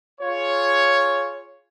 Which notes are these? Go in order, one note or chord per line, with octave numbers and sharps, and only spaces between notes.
F4 G#4 C#5